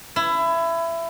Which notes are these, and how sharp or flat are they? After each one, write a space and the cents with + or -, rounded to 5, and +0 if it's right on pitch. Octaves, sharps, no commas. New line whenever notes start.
E4 +20